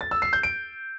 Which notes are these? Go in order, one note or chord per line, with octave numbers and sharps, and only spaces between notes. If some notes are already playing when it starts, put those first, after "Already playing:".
A6
E6
C7
G6
D7